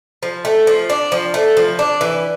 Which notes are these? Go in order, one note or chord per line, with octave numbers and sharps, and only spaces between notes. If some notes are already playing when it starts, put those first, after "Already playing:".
F3
A3
F3
D4
F3
A3
F3
D4
E3